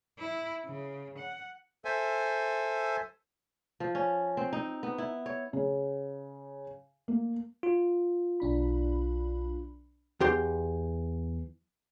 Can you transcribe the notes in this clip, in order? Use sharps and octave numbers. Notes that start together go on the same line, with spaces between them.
E4
C#3
F#5
A4 C5 E5 G#5
F3
C#4
C4
D#4
B3
E4
C#5
C#3
A#3
F4
B1 D4 B5
E2 G4 C6